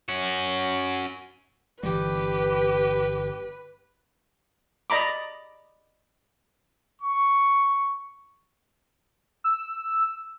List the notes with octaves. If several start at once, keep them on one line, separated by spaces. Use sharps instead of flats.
C#4 F#4
G1 E3 G3 G4 B4
D5 D#5 A#5 B5 D6
C#6
E6